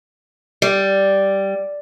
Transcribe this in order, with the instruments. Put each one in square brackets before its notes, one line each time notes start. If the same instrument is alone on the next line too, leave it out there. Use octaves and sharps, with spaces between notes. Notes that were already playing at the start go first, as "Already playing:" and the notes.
[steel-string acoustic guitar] G3